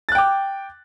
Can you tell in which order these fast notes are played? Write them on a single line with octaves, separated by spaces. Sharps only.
A6 F#6 G5 D6